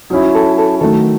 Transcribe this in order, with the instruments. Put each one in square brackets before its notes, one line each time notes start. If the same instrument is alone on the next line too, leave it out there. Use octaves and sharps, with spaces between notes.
[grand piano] F#3 C#4 E4 [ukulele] D#4
[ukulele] A4
A4
[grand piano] D#3 F#3 A3 [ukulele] A4